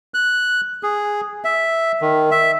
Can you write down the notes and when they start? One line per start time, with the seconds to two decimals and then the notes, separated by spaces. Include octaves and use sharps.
0.14 F#6
0.83 G#4
1.45 E5
2.02 D#3
2.31 E5